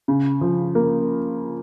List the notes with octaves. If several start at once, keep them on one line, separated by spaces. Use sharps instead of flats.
C#3
F3
A#3